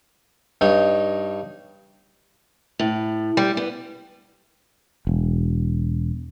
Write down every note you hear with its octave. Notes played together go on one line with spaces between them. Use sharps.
G2 D#4 C#5 D#5 D#6
A2
G3
B3
E1